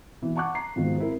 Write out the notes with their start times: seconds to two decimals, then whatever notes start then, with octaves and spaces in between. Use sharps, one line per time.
0.22 B2 E3
0.36 F#5 A5 C#6 D6 F#6
0.55 A#5 C7
0.76 G#2 B2 D#3 F3
0.98 C4 E4 A#4